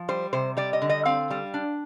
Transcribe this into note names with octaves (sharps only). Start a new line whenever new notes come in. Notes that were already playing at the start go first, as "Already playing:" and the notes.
Already playing: F3
G3 C5
C3 C5
G3 D5
D#5
D3
D#5
C4 F5
G3
D4